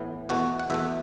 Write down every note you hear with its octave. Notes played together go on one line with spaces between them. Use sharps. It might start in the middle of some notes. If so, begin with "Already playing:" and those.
Already playing: A2 E3 B3
E2 B2 A3 F#4
F#5
E2 B2 A3 E5